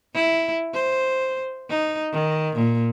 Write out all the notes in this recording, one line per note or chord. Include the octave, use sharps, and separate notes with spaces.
E4
C5
D#4
D#3
A#2